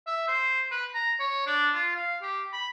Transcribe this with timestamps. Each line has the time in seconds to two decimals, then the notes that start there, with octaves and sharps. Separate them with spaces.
0.07 E5
0.28 C5
0.71 B4
0.94 A#5
1.19 C#5
1.46 D4
1.74 F4
1.95 F5
2.23 G4
2.53 B5